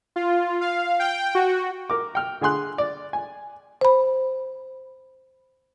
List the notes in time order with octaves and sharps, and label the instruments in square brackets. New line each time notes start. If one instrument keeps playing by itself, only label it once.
[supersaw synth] F4
F5
G5
F#4
[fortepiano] A#4 D6
G5 F6
D3 G#4 G#5 C6 F#6
D5
G#5
[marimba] C5 B5